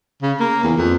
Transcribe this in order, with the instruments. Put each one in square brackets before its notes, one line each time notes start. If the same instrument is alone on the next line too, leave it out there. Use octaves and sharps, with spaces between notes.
[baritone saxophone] C#3
A#3
E2
F2